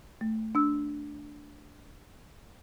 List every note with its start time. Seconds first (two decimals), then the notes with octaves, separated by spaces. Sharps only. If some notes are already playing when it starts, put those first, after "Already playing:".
0.21 A3
0.55 D4 E6